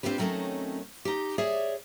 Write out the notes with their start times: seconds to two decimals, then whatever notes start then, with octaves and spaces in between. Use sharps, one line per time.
0.03 C4 D4 F4 G4 B4
0.18 D#3 F#3 A3 C4 C#4 D#4
1.05 D#4 G4
1.38 G#4 C#5 D5 E5